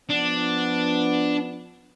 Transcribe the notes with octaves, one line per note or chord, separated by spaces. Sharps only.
F3 B3 D4